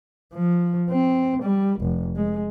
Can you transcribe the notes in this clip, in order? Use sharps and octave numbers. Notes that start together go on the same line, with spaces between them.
F3
C4
G3
F1
G#3